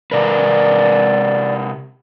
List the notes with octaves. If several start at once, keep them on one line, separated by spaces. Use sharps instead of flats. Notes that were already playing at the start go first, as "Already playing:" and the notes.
C3 A#4 B4 D5